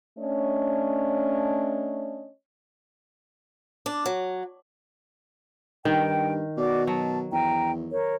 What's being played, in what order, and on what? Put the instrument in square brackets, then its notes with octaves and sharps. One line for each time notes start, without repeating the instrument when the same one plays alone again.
[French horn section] A3 C#4 D4 C#5 D#5
[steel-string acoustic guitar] D4
F#3
[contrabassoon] G2 [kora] D#3 [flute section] G5
[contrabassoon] B2 [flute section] F#4 D5 D6
[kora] F#3 [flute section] A5
[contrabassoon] E2 [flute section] G5 A#5
[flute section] A#4 C#5